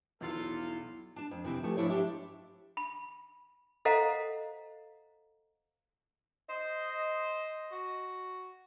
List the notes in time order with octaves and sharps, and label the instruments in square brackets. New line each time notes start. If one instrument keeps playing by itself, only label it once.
[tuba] B1 [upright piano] E2 F3 [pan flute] E4 [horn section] F4 A4
[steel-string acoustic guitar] D4 A5
F2
C3 E3 C4
E3 F3 G3 A3
G#2 F3 D4 E4 C#5
D4 G4 E5
[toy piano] B5
A4 C5 D#5 F5 F#5 A#5
[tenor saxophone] C5 [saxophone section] D#5
[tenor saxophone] F#4